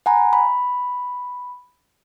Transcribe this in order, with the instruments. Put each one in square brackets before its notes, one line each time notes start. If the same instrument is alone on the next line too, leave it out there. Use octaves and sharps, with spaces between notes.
[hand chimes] F#5 G#5 A#5 B5
B5